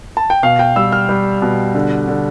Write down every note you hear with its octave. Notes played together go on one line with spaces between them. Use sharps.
A5
G5
B2 F5
G5
G3 E6
F6
G3
B2
D3
D3